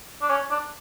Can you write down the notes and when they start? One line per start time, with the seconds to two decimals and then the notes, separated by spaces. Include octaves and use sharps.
0.21 D4
0.30 C#4
0.50 D4